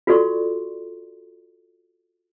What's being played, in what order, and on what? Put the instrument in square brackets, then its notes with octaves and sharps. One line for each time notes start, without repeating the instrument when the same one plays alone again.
[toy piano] F4 F#4 A4 D5 C6 C#6